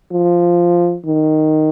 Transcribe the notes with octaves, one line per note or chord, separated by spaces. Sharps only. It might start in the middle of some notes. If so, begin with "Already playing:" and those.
F3
D#3